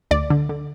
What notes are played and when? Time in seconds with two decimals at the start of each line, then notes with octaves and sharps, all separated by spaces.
0.11 D2 D5
0.30 D3
0.49 D3